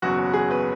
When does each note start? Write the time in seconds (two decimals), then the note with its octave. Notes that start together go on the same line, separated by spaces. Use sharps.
0.02 F#1 E2 B2 F#3 C#4 F#4
0.33 G#4
0.49 B3 B4